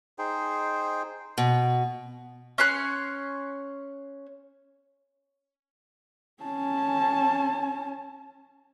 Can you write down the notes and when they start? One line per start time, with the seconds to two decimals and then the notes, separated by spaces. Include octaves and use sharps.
0.18 D#4 G#4 C5 G5
1.38 B2
2.58 C#4 C#5 C6 F#6
6.43 C#4 A5